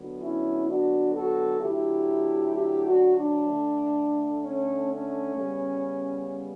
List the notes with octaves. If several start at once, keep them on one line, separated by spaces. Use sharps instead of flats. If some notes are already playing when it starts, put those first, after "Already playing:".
Already playing: D3 F#3 B3
C#4 E4
D4 F#4
F#4 A4
D3 F#3 A3 E4 G4
E4 G4
D4 F#4
D4
D3 A3
C#4
C#4
C#3 G3 B3